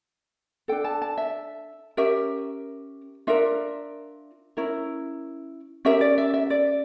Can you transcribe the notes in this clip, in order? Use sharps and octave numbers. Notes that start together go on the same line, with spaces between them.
D4 A4 G5
A5
A5
E5
C#4 G4 A#4 E5
D4 F4 A#4 E5
C#4 E4 A#4
C#4 G4 A#4 E5
D5
E5
E5
D5